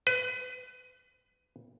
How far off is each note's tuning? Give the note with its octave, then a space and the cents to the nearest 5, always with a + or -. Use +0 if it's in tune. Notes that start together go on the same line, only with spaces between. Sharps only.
B4 +30